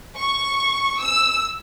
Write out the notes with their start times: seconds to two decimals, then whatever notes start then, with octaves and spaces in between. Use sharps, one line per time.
0.17 C#6
1.02 E6